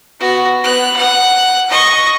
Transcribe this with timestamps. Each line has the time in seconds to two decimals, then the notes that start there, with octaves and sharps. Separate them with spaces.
0.20 B3 F#4
0.64 B3 F#6
0.97 F#5 F#6
1.70 D#5 C#6